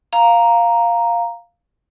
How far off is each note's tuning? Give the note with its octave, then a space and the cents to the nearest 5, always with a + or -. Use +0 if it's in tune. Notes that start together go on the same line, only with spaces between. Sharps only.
F5 +0 A#5 +0